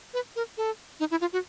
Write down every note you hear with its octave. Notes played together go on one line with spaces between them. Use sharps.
B4
A#4
A4
D#4
E4
F4
F#4